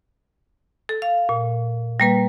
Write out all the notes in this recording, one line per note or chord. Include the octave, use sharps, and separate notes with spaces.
A4
F5
A#2
G3 A#3 B4